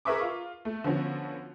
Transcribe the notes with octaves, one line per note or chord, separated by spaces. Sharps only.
G#4 A#4 B4 E5 C#6 D6
F4
A3
D3 F3 B3 C#4 F#4